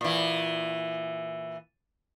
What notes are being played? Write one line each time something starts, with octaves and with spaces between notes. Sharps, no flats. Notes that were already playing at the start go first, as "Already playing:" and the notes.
A#2 E3